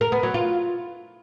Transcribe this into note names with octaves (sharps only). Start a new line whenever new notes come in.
A#4
B3
F#3
F4